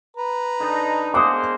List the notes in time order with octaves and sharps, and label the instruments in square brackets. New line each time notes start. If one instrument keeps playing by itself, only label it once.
[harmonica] B4 A#5
[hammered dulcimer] D3 D#5 A5 [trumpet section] D#4
[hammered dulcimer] G#3 B3 F#5 [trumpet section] A#3 C5 [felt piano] D6 D#6